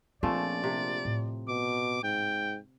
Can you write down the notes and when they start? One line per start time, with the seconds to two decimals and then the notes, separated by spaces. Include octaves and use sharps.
0.23 A#1 F3 A3 C4 C#4 D5
0.64 C3
1.05 A2
1.48 B2 D6
2.03 G#2 G5